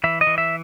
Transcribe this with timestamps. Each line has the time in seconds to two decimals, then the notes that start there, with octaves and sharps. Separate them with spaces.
0.04 E3 E5
0.21 D#5
0.27 E3
0.38 E5